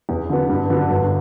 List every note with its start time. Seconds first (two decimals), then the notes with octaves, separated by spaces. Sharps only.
0.09 E2
0.29 D3 F#3 B3
0.49 G2
0.70 D3 F#3 B3 D4
0.90 G1